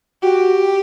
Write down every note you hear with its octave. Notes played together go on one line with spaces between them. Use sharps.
F#4 G4